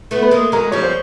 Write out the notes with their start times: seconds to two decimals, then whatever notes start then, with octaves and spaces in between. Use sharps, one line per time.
0.11 A3 B3
0.22 B4
0.31 G#3 A#3
0.52 F#3 G#3 A#4
0.72 F3 G3 C#5
0.83 C5